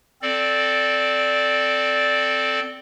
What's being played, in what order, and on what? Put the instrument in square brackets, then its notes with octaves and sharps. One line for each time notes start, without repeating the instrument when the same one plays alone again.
[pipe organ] C4 A4 D5